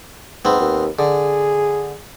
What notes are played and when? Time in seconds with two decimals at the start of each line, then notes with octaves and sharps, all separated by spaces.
0.45 G#2 B3 C4
0.60 D#2
0.99 D3 G#4